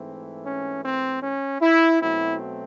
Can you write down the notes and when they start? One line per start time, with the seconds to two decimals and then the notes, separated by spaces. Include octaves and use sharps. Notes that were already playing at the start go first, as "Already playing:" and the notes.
Already playing: G#2 E3 A3 C4
0.45 C#4
0.85 C4
1.23 C#4
1.61 E4
2.01 B2 F#3 A3 C4 E4